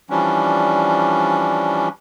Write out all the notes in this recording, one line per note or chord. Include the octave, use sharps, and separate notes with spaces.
E3 F3 G3 C#4 D4